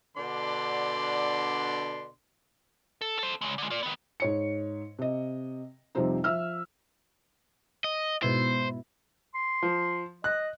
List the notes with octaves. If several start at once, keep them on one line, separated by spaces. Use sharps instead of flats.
B2 D3 D4 D5 C6
A4
A4 C5
C#3 G#3
D3 G#3
F4 D5
D#3 B3
G#2 C#5 C#7
C3 D#5
F2 C3 F3 G3 C4 D#4
F3 E5 E6 F6
D#5
G#2 B2 E4 C5
C6
F3
D#5 F#6